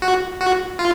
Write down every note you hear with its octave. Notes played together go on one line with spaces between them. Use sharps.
F#4
F#4
F4